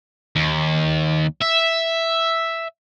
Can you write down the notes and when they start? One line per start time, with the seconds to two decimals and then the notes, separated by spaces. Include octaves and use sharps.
0.36 D#2
1.42 E5